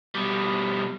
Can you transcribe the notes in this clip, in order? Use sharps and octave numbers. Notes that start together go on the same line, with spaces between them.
B2 G3